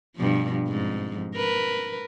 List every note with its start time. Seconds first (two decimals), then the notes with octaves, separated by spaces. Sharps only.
0.16 G2 B2 F3
0.68 F2 G#2
1.35 A#4 B4